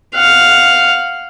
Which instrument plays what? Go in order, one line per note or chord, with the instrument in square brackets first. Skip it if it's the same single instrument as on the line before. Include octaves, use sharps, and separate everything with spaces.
[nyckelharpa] F5 F#5